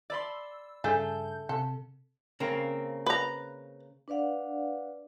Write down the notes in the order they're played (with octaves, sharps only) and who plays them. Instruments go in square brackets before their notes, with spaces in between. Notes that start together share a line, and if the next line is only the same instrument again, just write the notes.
[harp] D5 B5 C6 [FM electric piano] E6
[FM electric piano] G2 C#3 G6 [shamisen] A3 G#4 [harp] A4
[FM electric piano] C3 [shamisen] A4
[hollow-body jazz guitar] C#3 A#3 C4
[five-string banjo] B4 A#5
[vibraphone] D4 B4 D5 F5 F#5